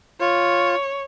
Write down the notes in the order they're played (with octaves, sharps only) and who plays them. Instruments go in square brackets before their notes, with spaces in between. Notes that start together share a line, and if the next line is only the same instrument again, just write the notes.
[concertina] F4 [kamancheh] C#5